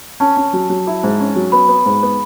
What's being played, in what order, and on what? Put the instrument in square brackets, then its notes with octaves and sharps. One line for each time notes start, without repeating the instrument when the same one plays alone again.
[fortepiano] C#4 [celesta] A5
[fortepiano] C#4
F#3
F#3
E4
G#2
C#4
F#3
[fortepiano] B3 [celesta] B5
[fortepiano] B3
G#2
B3